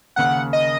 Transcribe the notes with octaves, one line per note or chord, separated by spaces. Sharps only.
D#2 C#3 A#3 F#5
D#5